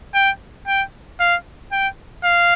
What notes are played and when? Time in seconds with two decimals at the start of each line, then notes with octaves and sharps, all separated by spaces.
0.15 G5
0.67 G5
1.20 F5
1.72 G5
2.24 F5